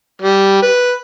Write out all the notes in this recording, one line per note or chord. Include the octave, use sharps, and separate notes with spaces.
G3
B4